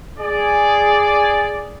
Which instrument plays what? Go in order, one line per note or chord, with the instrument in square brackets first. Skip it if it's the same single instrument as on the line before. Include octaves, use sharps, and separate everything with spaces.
[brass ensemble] G#4 D5